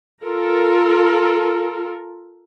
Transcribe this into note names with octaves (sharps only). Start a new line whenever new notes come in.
F4 A4 A#4